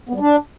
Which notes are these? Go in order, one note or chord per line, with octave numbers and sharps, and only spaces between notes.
B3
G3
D4